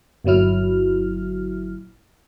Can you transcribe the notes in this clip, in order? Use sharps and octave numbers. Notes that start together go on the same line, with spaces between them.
G1 A#2 F#3 E4 F6